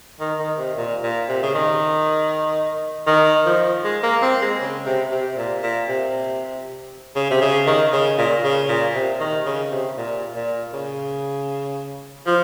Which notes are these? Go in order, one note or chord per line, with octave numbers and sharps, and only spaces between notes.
D#3
D#3
C3
A#2
A#2
C3
C#3
D#3
D#3
F3
G#3
A#3
C4
G#3
C#3
C3
C3
A#2
A#2
C3
C#3
C3
C#3
D#3
C#3
A#2
C#3
A#2
C3
D#3
C#3
C3
A#2
A#2
C#3
F3